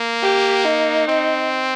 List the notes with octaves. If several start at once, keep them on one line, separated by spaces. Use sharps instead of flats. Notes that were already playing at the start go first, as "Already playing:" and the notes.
Already playing: A#3
G4
D#4
C4